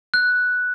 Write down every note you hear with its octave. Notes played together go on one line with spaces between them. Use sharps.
F#6